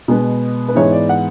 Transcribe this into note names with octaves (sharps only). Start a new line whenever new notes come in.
B2 G#3 B3
B4
G#2 E3 B3 C#5
D5
F#5